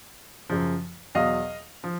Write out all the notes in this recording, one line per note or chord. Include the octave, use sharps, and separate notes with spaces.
F#2 C#3 F3
E2 B2 F#3 D#5 F5
F3